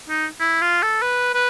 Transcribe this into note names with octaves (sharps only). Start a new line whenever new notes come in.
D#4
E4
F4
A4
B4
B4